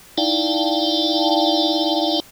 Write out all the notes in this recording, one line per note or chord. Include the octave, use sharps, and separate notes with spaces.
D#4 E4 D5 F5 G5 A5